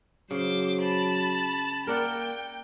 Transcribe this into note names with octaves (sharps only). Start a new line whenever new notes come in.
C#3 F#3 C5 D6
A5 B5
A#3 A#4 D5 F#5 G5